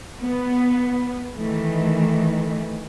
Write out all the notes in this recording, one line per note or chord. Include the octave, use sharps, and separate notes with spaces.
B3
D#3 E3 A3